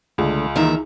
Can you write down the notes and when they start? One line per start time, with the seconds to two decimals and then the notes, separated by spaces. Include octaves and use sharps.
0.18 C#2 D3 A3
0.56 D#3 E3 A#3 D#4 E5 A#5